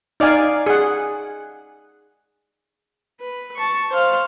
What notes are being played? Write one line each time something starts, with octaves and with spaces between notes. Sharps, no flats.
D#4 D5 F5 G#5
G#4 F#5
B4
A5 C#6
C5 F5